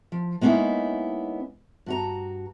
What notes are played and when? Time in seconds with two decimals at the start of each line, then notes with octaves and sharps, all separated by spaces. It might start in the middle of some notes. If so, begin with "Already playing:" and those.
0.12 F3
0.41 G#3 A#3 B3 C#4 D#4 E4
1.86 G2 F#4 A#5